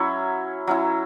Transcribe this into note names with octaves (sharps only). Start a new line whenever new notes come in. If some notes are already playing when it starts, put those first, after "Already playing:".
Already playing: F#3 C#4 E4 C#5
F#3 C#4 E4